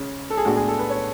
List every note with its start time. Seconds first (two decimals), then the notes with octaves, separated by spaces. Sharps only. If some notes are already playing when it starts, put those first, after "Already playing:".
Already playing: C#3 G#3 C#4
0.30 A4
0.37 G#4
0.45 A2 G#3 B3 D4 F#4
0.56 G#4
0.68 A4
0.79 B4
0.89 C#5